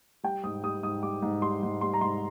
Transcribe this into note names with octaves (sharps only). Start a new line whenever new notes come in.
G3 G5
G#2 D#6
G3 D#6
G#2 D#6
G3 D6
G#2
G3 C6
G#2
G3 C6
A#5
G#2 C6